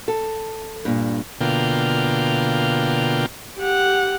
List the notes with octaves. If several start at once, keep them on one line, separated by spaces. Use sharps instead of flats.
A4
G2 A#2
B2 D3 A#3 F4 G5
G4 F#5